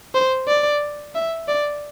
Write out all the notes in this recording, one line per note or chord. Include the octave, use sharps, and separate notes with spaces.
C5
D5
E5
D5